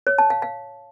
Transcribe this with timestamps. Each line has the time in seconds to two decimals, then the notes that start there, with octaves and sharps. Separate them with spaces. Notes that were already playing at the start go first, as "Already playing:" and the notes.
0.07 C#5
0.18 A5
0.30 F5
0.42 F5